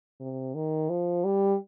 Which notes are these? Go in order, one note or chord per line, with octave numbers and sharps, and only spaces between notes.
C3
D#3
F3
G3